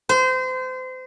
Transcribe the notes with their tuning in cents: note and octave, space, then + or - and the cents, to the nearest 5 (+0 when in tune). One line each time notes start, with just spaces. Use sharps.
C5 -30